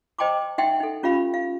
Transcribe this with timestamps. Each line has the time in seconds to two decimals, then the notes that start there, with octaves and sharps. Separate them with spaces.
0.18 C5 D#5 G5 A5 C6 D6
0.58 D#4 E5 F#5 G5 C6
0.80 D#4 A4
1.03 C#4 F4 G4 F5 B5
1.34 F5